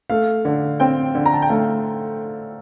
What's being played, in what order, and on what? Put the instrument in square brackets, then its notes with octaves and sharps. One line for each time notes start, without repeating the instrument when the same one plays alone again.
[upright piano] A3 [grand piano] F5
[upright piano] D3
[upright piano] C4 [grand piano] G5
[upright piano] D3
[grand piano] A#5
A5
G5
[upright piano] A3 [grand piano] F5